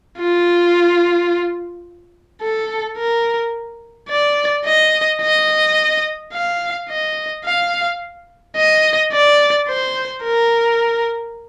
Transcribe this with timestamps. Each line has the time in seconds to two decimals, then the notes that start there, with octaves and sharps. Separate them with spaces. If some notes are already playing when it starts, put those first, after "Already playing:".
0.19 F4
2.42 A4
2.97 A#4
4.09 D5
4.65 D#5
5.21 D#5
6.33 F5
6.89 D#5
7.45 F5
8.57 D#5
9.13 D5
9.69 C5
10.24 A#4